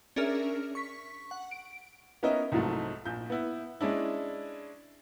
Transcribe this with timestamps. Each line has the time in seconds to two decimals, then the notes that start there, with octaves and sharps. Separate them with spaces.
0.16 C#4 D4 G#4 A#4 E5 F6
0.75 C#6 B6
1.31 F#5
1.51 D7
2.23 B3 C#4 D#4 A#4 D#5 E5
2.52 C2 G#2 F3 F#3 A3
3.05 A#1 G6
3.30 B3 E4
3.81 G#3 C#4 D4 E4